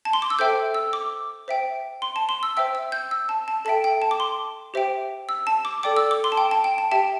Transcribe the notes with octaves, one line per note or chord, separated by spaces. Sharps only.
A5
C6
D6
E6
A4 C5 E5 G5 G6
E6
D6
C5 E5 G5
C6
A5
C6
E6
C5 E5 G5 E6
E6
G6
E6
A5
A5
A4 E5 G5 A5
G5
A5
D6
C6
G4 C5 E5 G5
E6
A5
D6
A4 D5 G5 D6
E6
D6
C6
A5
G5
A5
G5
A5
G4 E5 G5 A5